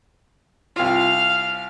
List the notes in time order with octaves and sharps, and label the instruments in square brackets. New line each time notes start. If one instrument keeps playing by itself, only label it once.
[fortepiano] C2 F4 [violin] F5